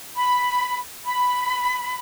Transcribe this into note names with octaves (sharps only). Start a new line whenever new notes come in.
B5
B5